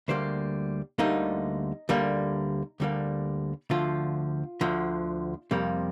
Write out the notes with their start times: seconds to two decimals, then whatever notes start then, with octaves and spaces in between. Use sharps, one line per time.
0.08 D2 D3 G3 A#3 C5
0.98 D2 D3 G3 A#3 D#4
1.89 D2 D3 G3 A#3
2.80 D2 D3 G3 A#3
3.70 D2 D3 F3 F4
4.61 D2 D3 F3
5.51 F2 C3 G3 A#3